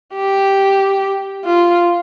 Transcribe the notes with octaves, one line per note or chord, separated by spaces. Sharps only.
G4
F4